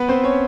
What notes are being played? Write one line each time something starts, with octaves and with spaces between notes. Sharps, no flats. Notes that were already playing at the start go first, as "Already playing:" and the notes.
Already playing: B3 B4
C4 C5
C#4 C#5